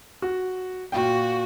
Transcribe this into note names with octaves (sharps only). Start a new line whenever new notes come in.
F#4
A#2 F#4 F5 G5